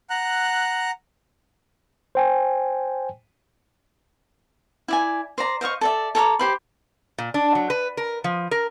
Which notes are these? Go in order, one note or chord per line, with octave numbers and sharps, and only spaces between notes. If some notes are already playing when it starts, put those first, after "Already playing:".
F#5 A#5 F#6
C5 G5 G#5
E4 D5 G#5
C5 D5 A#5
C5 D#5 F5 C#6
A4 D5 E5
A4 C#5 A#5 D6
G4 C5 B5
A#2
D4
F#3
B4
A#4
F3
A#4